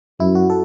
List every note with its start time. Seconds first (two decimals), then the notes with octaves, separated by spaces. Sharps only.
0.20 F#2 E4
0.35 F#4
0.50 A4